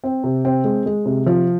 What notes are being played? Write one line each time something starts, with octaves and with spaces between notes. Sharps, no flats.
C4
C3
C4
G#3
G#3
C3
F3